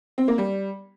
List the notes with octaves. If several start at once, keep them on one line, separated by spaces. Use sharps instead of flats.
C4
A#3
G3